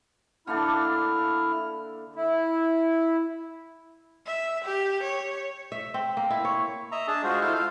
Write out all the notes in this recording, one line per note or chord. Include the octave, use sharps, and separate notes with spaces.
D3 A#3 D4 E4 F6
E4
E5
G4
C#5
E5
C4
A#3
E4
C#5
D#5 E5 A#5
D4 G#4 A5
G#3 F4 F#4 C5
E4 A4 C5 F5
F4 F5